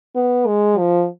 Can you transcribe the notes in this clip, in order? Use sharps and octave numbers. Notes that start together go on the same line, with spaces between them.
B3
G#3
F3